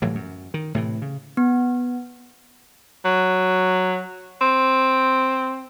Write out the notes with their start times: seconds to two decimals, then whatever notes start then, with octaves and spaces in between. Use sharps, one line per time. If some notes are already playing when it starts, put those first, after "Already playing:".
0.02 G1 A2 E3 F#3
0.15 F#2
0.54 D#3
0.75 A2 C3 E3
1.02 C#3
1.37 B3
3.05 F#3
4.41 C4